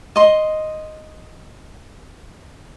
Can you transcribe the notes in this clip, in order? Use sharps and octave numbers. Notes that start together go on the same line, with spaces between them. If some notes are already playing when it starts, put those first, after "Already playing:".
D#5 C6